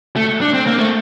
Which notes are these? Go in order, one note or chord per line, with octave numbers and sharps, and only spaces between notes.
A3
D4
C4
A#3
A3